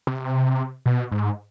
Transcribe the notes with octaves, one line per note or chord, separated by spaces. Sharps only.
C3
B2
G#2